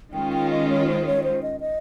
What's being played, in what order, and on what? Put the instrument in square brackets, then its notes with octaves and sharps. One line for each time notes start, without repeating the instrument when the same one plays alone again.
[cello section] D#3 G#3 C#4 F4 [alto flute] G5
[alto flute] G5
D#5
C#5
C5
C#5
C5
D#5
D#5